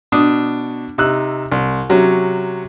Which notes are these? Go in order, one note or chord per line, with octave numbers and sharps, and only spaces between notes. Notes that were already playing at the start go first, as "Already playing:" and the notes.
B2 D4 D6 D#6
C3 D#4 E6 F#6
C2
C3 F#3 C#4